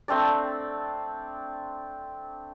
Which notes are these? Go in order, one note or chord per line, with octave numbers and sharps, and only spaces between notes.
A3 C4 D4 D5